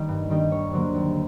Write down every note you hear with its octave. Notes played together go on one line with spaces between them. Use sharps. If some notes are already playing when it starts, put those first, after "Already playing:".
Already playing: D#3 G3 A#3 D#4
G2
D#3 G3 A#3 D#4
D#2 C#5
D3 F#3 A#3 C5
D#2